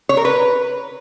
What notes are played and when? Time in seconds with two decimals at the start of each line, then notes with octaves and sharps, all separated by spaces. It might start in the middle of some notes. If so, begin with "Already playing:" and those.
0.09 C#5
0.17 A#4
0.25 B4